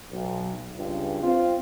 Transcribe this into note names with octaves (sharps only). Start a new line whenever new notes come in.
B1
C#2 G2
C4 F4